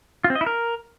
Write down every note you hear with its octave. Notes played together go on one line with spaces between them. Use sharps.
F4
C4
D#5
E4
A#4